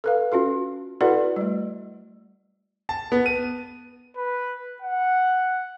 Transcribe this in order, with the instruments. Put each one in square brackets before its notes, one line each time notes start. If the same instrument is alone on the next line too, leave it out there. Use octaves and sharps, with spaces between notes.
[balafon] A4 B4 F5
C#4 F4 F#4 A4
E4 F#4 A4 B4 D5 F#5
G3 A3
[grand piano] A5
B3
D#7
[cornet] B4
F#5